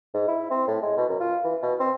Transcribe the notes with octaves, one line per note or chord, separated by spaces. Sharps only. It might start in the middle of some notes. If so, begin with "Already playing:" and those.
G#2
E4
C4
A2
G#3
B2
F#2
F4
E3
B2
C4